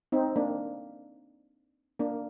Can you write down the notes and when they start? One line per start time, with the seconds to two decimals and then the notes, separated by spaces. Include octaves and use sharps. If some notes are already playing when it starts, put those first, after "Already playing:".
0.12 C4 D#4
0.36 A#3 D4
1.99 A#3 D4